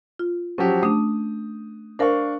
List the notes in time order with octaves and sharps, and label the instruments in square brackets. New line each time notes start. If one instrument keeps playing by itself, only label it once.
[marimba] F4
[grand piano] F3 F#3 G4 [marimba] C#4
[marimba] A3 D4 [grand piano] D#6
[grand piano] D4 F5 C#6 [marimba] A#4 C5